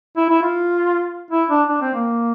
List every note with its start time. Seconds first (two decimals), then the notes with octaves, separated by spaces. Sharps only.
0.17 E4
0.29 E4
0.42 F4
1.31 E4
1.50 D4
1.69 D4
1.81 C4
1.94 A#3